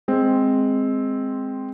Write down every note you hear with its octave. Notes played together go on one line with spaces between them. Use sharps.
G#3 C4